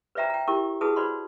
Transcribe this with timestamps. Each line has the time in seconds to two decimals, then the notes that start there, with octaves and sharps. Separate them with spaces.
0.15 B4 C5 D5 E5 G5 A#5
0.30 G5 A#5
0.48 E4 G4 A#4 G5 C#6
0.81 E4 F#4 G#4 B4 A5 D#6
0.96 F#4 B4 C5 D5 B5 C6